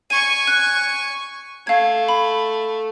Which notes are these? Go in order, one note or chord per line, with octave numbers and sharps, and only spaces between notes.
G#5 C#6 D#7
F#6
A3 F5 G#6
B5